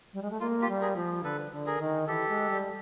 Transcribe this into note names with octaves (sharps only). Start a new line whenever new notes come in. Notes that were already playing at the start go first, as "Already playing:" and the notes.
G3
G#3
A3
A#3 F4
F4 G4
G3
G#4 A#4
F3
D3 A4 B4
D3
G#4 A#4
D#3
E3 G4 A4
G#3
G3